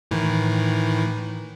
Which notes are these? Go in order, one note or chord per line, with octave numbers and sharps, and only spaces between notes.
A2 D#3 E3